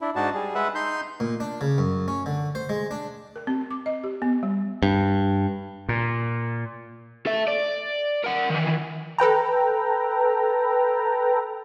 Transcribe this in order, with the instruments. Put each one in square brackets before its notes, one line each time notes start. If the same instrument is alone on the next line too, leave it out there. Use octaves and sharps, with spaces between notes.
[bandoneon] D4 E4
G#2 D4 D#4 F#4 A5
G3 G#4
G#3 B4 E5 F#5
D#4 C6 G6
[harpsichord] A#2
D4
C#3
F#2
C#4
D3
C5
G#3
D4
[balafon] A#4
C4
D6
D#5
G4
B3
G3
[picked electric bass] G2
[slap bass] A#2
[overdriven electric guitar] A4 E5
D5
A#4 F#5
D#3 E3
[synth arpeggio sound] A4 B4 G5 A#5